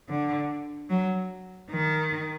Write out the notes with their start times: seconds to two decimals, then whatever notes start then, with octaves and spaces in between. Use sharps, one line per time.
0.09 D3
0.90 F#3
1.71 D#3